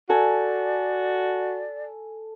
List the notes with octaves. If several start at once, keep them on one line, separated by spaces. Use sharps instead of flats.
F#4 A4 D5 G#5